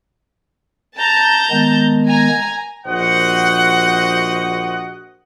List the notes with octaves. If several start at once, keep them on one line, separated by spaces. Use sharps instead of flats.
A5 A#5 G6
D#3 G#3 B3
G#5 A#5
A#1 F#4 C5 D#5 F#5